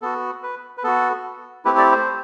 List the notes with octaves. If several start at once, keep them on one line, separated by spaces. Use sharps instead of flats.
B3 F#4 A4
B4
B4
B3 F#4 A4
A3 C4 E4 G4 B4
D5
C5